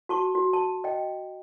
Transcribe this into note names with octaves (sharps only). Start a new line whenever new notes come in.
F#4 A5 C#6
F#4
A5
D#5 G5